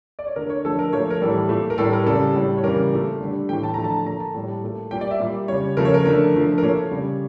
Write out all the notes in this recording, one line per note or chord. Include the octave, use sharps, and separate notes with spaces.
D5
C#5
D3 A3 A#4
C#5
D3 F3 A3 A4
A#4
A#2 F3 A3 C#5
A#4
A2 E3 G3 A4
A#2 A3
A#4
A2 G3 A4
A#4
C#3 G3 A4
A2 G3
C#5
C#3 E3 G3 A#4
A#2 A3
D3 G3
A2 E3 A3 G5
A5
D3 F3 A3 A#5
A5
A#2 A3 A#5
A5
A2 G3
A#2 A3
A#2 G3 G5
D5
E5
A#2 G3
C#3 G3 C#5
C#3 F3 A3 A#4
C#5
A#4
D3 F3 A3 A#4
D3 F3 A3
A#4
A#2 A3 C#5
C#3 G3